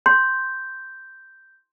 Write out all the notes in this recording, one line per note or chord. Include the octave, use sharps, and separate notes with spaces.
C6 G6